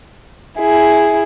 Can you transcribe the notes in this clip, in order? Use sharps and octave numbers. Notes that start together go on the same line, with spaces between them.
E4 G#4